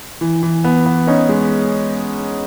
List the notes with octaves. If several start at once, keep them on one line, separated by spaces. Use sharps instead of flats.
E3
E3
B3
B3
C#4 D#4
G#3